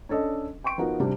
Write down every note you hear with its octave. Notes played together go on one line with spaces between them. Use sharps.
C#4 D4 A4 D#5
G5 C6 C#6 D7
F3 B3 D#4 F#4 A#4
C3 G3 D4